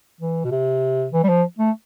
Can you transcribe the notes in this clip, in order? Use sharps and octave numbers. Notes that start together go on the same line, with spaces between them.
E3
B2
C3
E3
G3
F3
A3